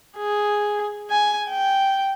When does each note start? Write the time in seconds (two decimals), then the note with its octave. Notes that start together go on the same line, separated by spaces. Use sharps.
0.17 G#4
1.11 G#5
1.49 G5